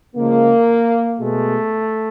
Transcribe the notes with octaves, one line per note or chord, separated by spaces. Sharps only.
C#3 F3 G#3 A#3
B2 G#3 A3